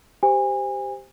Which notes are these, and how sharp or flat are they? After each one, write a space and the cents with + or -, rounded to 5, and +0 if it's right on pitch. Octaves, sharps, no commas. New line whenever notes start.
G4 +0 C5 -10 G#5 -30